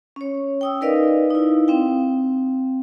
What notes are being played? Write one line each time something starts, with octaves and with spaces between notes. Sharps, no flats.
C#4 C#5
G5 D#6 E6
D#4 A#4 B4 D5 D#5 F5
D#4 E4
C4 F5 G5